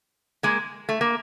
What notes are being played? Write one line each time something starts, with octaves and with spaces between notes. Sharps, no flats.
G#3 A#3
A3
A#3